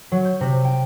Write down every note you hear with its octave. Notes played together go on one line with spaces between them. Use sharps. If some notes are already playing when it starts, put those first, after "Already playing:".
F#3
G6
C3
G5